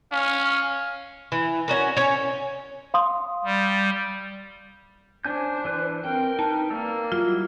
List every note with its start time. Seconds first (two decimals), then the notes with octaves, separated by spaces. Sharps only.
0.12 C#4 F5
1.32 E3
1.68 C#4 F#4 A#4
1.97 C#4 C#5
2.94 F5 C6 D#6
3.44 G3
5.25 C#4 D4 C5 G#5 G6
5.65 E3 B4 F#6
6.05 C4 A#4 G5
6.39 D#4 B4 A5
6.70 A#3 D5 A#5 E6
7.12 F#3 G3 E4 F4